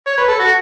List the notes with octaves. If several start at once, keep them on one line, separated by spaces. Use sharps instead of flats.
C#5
B4
A4
F#4